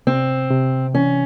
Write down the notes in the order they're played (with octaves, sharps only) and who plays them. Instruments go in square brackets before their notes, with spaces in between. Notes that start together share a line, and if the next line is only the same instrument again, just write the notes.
[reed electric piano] C3 [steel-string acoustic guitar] C4
[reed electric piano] C3
[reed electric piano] E3 [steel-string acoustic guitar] C#4